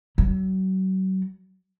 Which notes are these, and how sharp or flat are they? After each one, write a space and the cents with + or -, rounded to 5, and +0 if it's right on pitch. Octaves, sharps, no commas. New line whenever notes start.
F#3 +35